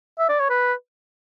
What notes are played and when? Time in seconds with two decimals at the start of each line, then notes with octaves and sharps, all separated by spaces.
0.19 E5
0.29 D5
0.40 C#5
0.50 B4